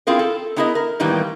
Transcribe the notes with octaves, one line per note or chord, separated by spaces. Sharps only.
C4 E4 F4 G#4 A#4
A4
B3 D4 E4 G#4 A#4 D#5
A#4
A2 D#3 E3 G3 A#3 B3